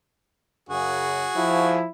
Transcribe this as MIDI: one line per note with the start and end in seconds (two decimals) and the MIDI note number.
0.69 1.25 42
0.69 1.25 49
0.69 1.77 66
0.69 1.77 68
1.36 1.84 53
1.36 1.90 64